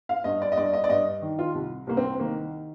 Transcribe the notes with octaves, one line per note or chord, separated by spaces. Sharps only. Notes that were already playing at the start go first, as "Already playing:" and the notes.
F5
G2 D#5
D5
D#5
G2 D5
D#5
D5
G2 D#5
D#3
F4
C2
C2 A#3
C4
D#3 A#3